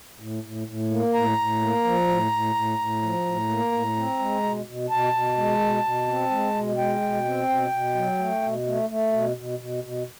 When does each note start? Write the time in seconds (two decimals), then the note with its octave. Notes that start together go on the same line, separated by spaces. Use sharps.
0.20 A2
0.43 A2
0.67 A2
0.91 A#3
1.14 A2 A#5
1.38 A2
1.61 A#3
1.84 F3
2.08 A2
2.32 A2
2.55 A2
2.79 A2
3.02 F3
3.26 A2
3.48 A#3
3.72 A2
3.96 C4
4.19 G#3
4.43 B2
4.66 B2
4.90 B2 A5
5.14 B2
5.37 G#3
5.60 B2
5.84 B2
6.08 C4
6.31 G#3
6.55 B2
6.78 G#3 G5
7.01 B2
7.25 C4
7.49 B2
7.71 B2
7.95 F#3
8.18 A3
8.42 B2
8.66 A3
8.89 A3
9.13 B2
9.37 B2
9.59 B2
9.84 B2